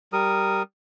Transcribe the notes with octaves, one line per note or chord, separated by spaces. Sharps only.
G3 A#4 D#6